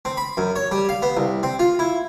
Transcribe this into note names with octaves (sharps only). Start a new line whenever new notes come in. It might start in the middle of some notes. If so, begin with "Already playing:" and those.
C4
B5
F#2
C#5
G3
F5
B3
C2
C4
F4
E4